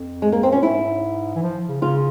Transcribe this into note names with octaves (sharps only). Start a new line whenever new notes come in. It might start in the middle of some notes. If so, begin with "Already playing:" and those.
Already playing: F2
G#3
A#3
C4
A#2 C#4
G#2 E4
E3
F3
C#3
C#3 F4